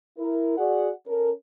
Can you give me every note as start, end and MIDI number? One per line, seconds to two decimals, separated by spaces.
0.19 0.57 64
0.19 0.57 70
0.58 0.90 66
0.58 0.90 68
0.58 0.90 74
0.58 0.90 78
1.07 1.31 61
1.07 1.31 69
1.07 1.31 70